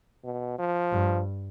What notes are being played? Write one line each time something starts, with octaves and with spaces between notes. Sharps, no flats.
B2
F3
G2